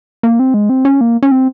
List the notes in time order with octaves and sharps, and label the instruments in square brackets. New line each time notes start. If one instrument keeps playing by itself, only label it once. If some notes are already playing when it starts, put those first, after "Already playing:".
[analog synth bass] A#3
C4
G#3
C4
C#4
A#3
C#4
C4